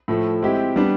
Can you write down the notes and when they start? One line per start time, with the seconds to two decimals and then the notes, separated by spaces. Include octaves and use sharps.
0.08 A2 F3 A3
0.42 G#3 C4 E4 G4
0.76 G3 B3 D4